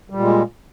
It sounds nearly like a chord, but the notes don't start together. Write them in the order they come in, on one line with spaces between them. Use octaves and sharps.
G3 A#2 G#3